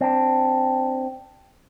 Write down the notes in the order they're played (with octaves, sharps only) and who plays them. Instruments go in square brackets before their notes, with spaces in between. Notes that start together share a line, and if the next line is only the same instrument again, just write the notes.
[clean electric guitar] C4 D4